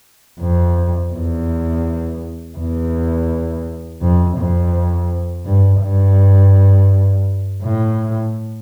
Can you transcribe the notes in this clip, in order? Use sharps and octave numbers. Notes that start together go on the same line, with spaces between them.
F2
E2
E2
F2
F2
G2
G2
A2